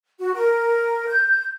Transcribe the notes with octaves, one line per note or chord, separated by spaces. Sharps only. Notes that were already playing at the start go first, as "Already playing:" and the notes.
F#4
A#4
G6